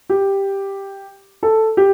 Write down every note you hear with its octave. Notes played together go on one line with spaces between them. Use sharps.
G4
A4
G4